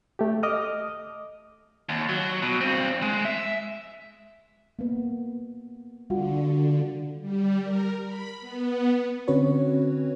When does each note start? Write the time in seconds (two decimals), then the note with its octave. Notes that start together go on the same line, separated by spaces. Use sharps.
0.19 A3 G4
0.43 D#5 D6 D#6 F6
1.89 D#2
2.09 F#3
2.42 B2
2.61 G2 C4
3.02 G#3
3.25 E5
4.79 A#3 B3
6.10 D3 G3 F4 F#4
7.21 G3
7.63 A#4
8.04 B5
8.41 B3
9.28 D3 C4 C#4 F#4 B4 C#5